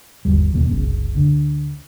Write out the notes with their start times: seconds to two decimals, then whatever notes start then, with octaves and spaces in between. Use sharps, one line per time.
0.25 G1 D#2 G3
0.52 E1 D#2 B2 A#3
0.69 F#1 C2 C#3
1.15 D2 D3